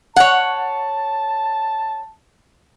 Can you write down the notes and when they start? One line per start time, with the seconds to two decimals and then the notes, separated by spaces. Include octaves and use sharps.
0.16 C#5 F#5 A5